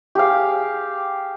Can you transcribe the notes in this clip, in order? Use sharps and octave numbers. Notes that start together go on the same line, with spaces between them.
G4 G#4 F5